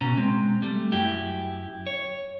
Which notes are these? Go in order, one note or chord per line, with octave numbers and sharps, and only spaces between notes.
B2 C#4 A#5
G#3 C4
G3 A3
F#2 E4 G4
C#5